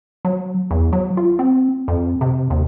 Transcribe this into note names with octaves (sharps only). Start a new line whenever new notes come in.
F#3
E2
F#3
F4
C4
F2
C3
D#2